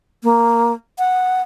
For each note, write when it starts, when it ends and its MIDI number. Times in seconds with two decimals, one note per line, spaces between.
0.23 0.73 58
0.99 1.42 78